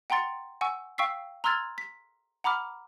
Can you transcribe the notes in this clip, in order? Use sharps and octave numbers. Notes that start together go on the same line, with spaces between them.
F#5 G5 A#5 C6 A6 C#7
F#5 G#5 C#6 E6
F5 G5 C#6 E6 B6 C7
A#5 C6 E6 F6 G#6 A6
B6
F#5 A#5 B5 D6 F6